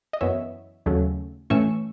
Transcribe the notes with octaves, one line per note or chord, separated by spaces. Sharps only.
D#5
F#2 E3 B3 C#5 E5
D#2 C#3 F#3 A3 C#4
A2 E3 A3 C#4 C#6 E6